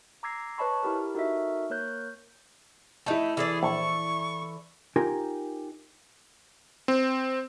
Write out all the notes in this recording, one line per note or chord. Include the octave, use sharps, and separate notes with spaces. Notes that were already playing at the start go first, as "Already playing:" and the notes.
A#5 D6 E6 G#6 A#6 C7
B4 C#5 D#5 A5 B5 C#6
E4 G4 A#4
D#4 F#4 A4 A#4 D#5 E5
A#3 A#4 C#5 F#6 G6
A3 D#4 E4 A5
E3 G#4 A4 D5
A#1 C#6
D#4 F4 G4 A#4 G#5
C4